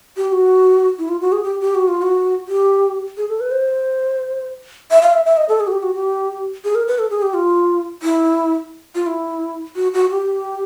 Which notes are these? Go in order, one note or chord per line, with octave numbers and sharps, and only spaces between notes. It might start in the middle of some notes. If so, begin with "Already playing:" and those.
G4
G4
F#4
E4
F4
F#4
G#4
G4
G4
F#4
F4
F#4
G4
G#4
A4
B4
C5
E5
F5
E5
E5
D#5
A4
G#4
F#4
G4
F#4
G4
G#4
A#4
B4
A4
G#4
G4
F4
E4
F4
E4
F#4
F#4
G4